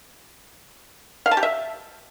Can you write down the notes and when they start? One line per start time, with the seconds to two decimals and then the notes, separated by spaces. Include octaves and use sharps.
1.26 F5
1.31 A5
1.37 G4
1.43 E5